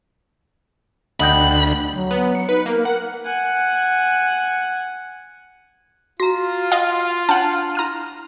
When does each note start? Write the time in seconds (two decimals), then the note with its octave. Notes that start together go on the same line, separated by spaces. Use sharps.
1.20 D2 D#5 F#5 G5 B5
1.94 F#3
2.11 B3
2.35 C#7
2.49 D#4 B4
2.66 A#3 A#4
2.85 A#4 F#5
3.25 F#5 G#5
6.20 F4 F#4 A#5 A#6
6.72 D#5 F5
7.29 D4 C#5 F#5 A5 C6
7.75 E4 A#5 C6 F6 D#7